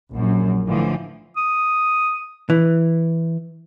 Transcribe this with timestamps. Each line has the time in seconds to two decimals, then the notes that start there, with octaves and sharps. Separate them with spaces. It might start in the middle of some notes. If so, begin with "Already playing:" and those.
0.13 A#1 F#2
0.67 A2 D3 E3 F3
1.37 D#6
2.50 E3